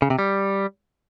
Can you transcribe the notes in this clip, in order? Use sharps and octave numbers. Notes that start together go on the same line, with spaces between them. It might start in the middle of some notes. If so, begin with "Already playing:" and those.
C#3
C3
G3